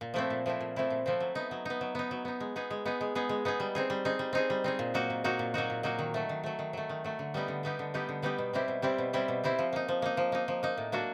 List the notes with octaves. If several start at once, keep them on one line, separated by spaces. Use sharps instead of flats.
A#2
F3 A3 C4 E4
A#2
F3 A3 C4 E4
A#2
F3 A3 C4 E4
A#2
F3 A3 C4 E4
F#3
B3 D#4
F#3
B3 D#4
F#3
B3 D#4
F#3
B3 D#4
G#3
B3 D#4 G#4
G#3
B3 D#4 G#4
G#3
B3 D#4 G#4
G#3
B3 D#4 G#4
G3
C4 D#4 G#4
G3
C4 D#4 G#4
G3
C4 D#4 G#4
G3
C4 D#4 G#4
A#2
F#3 A#3 D#4 F#4
A#2
F#3 A#3 D#4 F#4
A#2
F#3 A#3 D#4 F#4
A#2
F#3 A#3 D#4 F#4
D#3
F#3 A3
D#3
F#3 A3
D#3
F#3 A3
D#3
F#3 A3
D3
G3 B3 D#4 G4
D3
G3 B3 D#4 G4
D3
G3 B3 D#4 G4
D3
G3 B3 D#4 G4
B2
G3 C4 E4 G4
B2
G3 C4 E4 G4
B2
G3 C4 E4 G4
B2
G3 C4 E4 G4
F3
A#3 D#4
F3
A#3 D#4
F3
A#3 D#4
F3
A#3 D#4
A2
F#3 A#3 D4 F#4